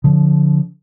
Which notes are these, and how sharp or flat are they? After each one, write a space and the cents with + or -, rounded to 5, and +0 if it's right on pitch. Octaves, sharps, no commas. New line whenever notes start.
D3 -30 F3 +0